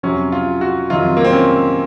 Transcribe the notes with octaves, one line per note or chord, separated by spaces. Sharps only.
F2 C3 F#3 C#4
F4
F#4
F2 C3 D#3 F#3 F4
A#3
C4
C#4